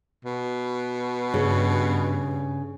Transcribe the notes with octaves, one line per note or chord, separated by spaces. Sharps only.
B2
G2 C#3